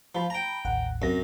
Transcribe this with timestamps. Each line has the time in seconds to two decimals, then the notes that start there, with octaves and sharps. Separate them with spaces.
0.15 F3 A5 B5
0.30 G5 A#5
0.65 A1 D#2 F#5
1.02 C2 F#2 C4 A#6